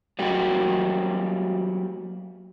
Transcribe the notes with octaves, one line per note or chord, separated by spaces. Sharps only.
F#3 G3 A#3 F#4 G4